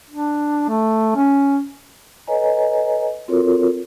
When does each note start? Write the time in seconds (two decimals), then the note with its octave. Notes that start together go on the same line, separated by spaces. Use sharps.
0.10 D4
0.68 A3
1.16 C#4
2.27 A4 B4 C#5 D#5 G#5 A#5
3.28 C4 F4 F#4 A4 A#4 C#5